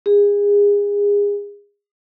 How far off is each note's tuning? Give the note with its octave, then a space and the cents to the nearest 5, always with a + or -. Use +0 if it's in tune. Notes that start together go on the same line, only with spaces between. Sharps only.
G#4 -30